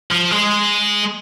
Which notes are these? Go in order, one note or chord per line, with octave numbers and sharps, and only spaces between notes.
F3
G#3